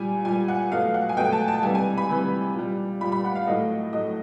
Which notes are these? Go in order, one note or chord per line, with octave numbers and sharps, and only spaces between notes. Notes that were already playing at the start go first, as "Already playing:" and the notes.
Already playing: A#2 G3 G#5
A#2 G3 G#5
F#5
B2 F#3 A3 F5
F#5
G#5
B2 F#3 A3 G5
A5
A5
C3 E3 G3 G#5
G#5
B5
C3 E3 G3
A#2 G3
A#2 G3 B5
B5
F#5
F5
A2 F#3 A3 D#5
A2 F#3 A3 D#5